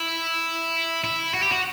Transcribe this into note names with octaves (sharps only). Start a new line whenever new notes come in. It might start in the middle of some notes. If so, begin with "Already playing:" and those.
Already playing: E4
E4
F#4
G4
F#4